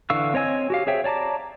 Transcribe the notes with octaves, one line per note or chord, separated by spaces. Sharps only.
D3 E3 F5 C#6 E6
C4 C#5 D#5 G#5 E6
F#4 G4 F5
G#4 C5 C#5 E5 G5
C#5 D5 A5 A#5 D6